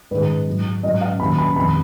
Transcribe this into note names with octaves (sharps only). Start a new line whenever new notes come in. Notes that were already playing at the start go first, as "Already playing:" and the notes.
G#2 D#3 G#3 B4
G#2 F#3
G#2 F#3 D#5
F5
D#2 D#3 F#3 B5
B5
F2 D#3 G#3 B5